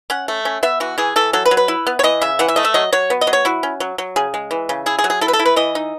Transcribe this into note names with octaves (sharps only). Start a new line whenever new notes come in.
C#4 F#5
A3
C#4
B3 E5
E3 F#4
E3 G#4
E3 A4
F#3 A4
B4
F#3
B4
E4
B3
C#5
E3 D#5
C#3 E5
E3 F#5
E5
A3 D#5
E5
F#3 D#5
F#3 C#5
B3
D#5
F#3
C#5
E4 F#4
C#4
F#3
F#3
C#3 G#4
G#3
E3
C#3
E4 G#4
G#4
F#3
G#4
E4 A4
B4
A4
E4
B4
E3 D#5
D#4